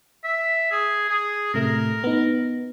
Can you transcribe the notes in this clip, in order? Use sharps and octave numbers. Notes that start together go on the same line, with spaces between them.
E5
G#4
G#4
A2 C3 A3 A#4
B3 D#4